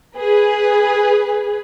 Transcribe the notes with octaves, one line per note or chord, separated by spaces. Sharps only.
G#4 B4